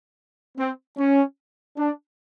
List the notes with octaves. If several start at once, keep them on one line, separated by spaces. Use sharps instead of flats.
C4
C#4
D4